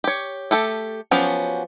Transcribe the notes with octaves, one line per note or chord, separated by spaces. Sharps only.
G4 C#5
A3 G4 A4
F3 F#3 B3 C#4 G4